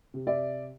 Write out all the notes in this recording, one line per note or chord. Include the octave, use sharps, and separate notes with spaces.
C3
D5 E5